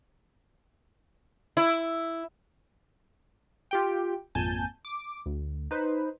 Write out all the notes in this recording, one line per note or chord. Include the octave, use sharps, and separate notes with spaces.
E4
F4 G4 G5
G#1 F2 A#2 G#5 A5 G6
D6
D2
D#4 B4 C5